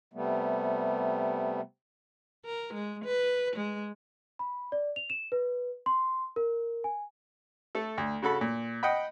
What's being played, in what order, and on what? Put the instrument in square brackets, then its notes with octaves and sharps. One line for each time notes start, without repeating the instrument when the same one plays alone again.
[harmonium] C3 G3 A3 B3
[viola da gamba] A#4
G#3
B4
G#3
[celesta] B5
D5
F7
E7
B4
C6
A#4
G#5
[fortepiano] A3 A4
D2
C#3 F#4 A4 B5
A#2
D#5 F#5 G5 B5